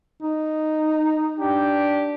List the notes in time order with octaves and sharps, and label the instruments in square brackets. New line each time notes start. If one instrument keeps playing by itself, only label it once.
[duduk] D#4
[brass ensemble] D4 G4